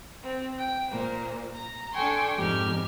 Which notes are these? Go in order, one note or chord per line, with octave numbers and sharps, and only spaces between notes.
C4
G5
A#2 A#3 C5
A#5
D4 A4 G5 G#5 C6 C#6
F2 G#2 G4 F6 G#6